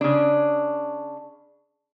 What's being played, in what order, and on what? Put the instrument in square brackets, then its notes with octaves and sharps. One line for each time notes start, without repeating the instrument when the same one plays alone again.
[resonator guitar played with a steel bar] C#3 D4